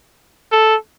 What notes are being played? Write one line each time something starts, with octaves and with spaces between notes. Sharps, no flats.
A4